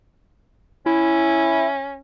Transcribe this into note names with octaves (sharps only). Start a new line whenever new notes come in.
C#4 E4